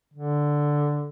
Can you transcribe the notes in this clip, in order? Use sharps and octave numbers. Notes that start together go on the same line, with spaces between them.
D3